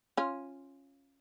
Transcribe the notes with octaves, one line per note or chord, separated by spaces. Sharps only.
C#4 F4